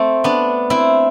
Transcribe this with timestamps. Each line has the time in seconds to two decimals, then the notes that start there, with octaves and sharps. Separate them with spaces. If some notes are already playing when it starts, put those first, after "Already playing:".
Already playing: A3 C4
0.24 B3 D4
0.70 C4 E4